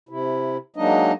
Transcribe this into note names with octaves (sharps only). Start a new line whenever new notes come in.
C3 E4
F#3 G#3 A#3 D4 D#4 D#5